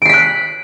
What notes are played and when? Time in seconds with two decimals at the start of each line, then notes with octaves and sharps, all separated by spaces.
0.02 D7
0.05 C7
0.09 B6
0.13 F#6